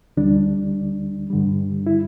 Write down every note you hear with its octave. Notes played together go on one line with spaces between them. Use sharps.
D2 D3 G3 D4
G2 D3 G3
E4